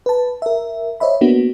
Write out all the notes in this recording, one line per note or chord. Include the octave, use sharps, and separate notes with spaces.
B4 A5
A#4 E5
C5 C#5 D#5 E5 B5
A#3 B3 D4 F#4